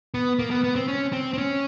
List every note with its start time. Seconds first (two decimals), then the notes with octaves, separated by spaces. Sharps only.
0.14 B3
0.39 A#3
0.51 B3
0.64 B3
0.76 C4
0.88 C#4
1.13 C4
1.34 C4
1.38 C#4